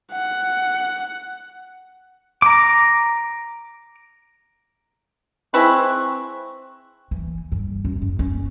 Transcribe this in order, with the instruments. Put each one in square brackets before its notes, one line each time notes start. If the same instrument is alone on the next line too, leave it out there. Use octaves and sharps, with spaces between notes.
[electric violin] F#5
[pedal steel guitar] A#5 D6
[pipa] G#3 E4 B4 [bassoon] C4 [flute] C#6
[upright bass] E3
G2
F#2
F#2
C#4